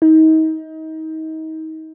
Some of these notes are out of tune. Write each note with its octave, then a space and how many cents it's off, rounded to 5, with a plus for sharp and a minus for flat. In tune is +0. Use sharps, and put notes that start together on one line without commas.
D#4 +30